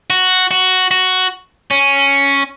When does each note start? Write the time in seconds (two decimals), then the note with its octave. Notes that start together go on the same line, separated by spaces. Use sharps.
0.10 F#4
0.51 F#4
0.91 F#4
1.71 C#4